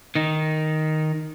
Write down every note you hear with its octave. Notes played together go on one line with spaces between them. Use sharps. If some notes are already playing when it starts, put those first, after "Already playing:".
D#3 D#4